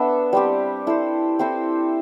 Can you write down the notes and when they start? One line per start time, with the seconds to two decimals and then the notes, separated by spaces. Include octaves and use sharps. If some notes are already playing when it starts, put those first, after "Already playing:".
Already playing: B3 D4 A4 E5
0.33 G3 C4 G4
0.87 E4 A4 C5
1.39 C4 E4 A4 C5